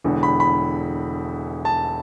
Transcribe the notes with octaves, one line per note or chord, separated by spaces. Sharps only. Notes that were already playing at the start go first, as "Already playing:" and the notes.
E1 E2 D3
B5
B5
A5